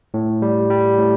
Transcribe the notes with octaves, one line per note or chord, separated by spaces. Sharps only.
A2
G3
G3
A2